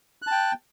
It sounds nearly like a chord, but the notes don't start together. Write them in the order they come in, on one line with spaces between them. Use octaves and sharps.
F#6 A5 G5